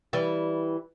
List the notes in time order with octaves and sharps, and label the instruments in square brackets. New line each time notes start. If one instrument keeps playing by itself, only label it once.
[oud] E3 G3